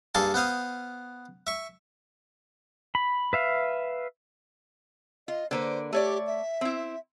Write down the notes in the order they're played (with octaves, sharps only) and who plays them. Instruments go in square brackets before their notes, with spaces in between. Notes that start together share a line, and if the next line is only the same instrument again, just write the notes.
[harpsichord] G2 A#3 G#4 A4 A5 C6
B3 C5 F5 D#6
E5 C#6
[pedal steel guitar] B5
B4 E5 F5
[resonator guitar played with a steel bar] F4 [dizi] D#5
[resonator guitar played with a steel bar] D3 A#3 B4 [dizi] C5
[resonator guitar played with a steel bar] A3 C#5 D5 [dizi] G4
[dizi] E5
[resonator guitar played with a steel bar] C4 E4